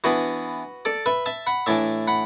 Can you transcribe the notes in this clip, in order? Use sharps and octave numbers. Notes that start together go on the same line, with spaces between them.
E3 B3 D4 F#4 B4
A4 D5
B4 E5
E5 A5
F#5 B5
A2 E3 D4 E5 A5
F#5 B5